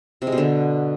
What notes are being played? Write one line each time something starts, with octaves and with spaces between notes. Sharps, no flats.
C3
G#3
B2
D3